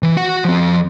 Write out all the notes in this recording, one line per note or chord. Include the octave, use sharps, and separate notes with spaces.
E3
F#4 F#5
F3 C4